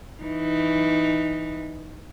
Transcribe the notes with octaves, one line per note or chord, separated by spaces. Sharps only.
E3 D#4